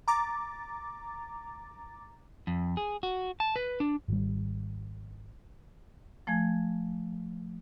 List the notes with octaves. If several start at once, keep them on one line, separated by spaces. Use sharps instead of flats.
A#5 D6 A6
F2
G#4
F#4
A5
B4
D4
G#1 G3
F3 A3 G#5 G#6